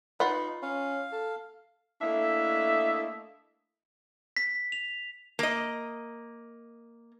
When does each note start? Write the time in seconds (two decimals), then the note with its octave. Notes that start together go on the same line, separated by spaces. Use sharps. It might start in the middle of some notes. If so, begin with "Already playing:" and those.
0.20 D#4 F4 B4 F#5
0.63 C#4 F5
1.12 A4
2.02 A3 A#3 D4 E4 D#5 E5
4.37 B6
4.72 F7
5.39 A#3 D#5